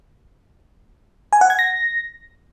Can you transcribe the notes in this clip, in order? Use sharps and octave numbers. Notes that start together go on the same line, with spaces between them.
G#5
F#5
G#6
A#6